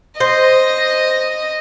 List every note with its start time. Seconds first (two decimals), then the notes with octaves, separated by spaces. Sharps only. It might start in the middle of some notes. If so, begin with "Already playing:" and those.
0.20 C5 D#5